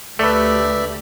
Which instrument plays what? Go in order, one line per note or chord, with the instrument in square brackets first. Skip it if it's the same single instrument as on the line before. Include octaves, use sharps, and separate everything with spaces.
[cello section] D2 G4 [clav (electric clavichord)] A3 [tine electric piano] A4 B4 [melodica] D5 E5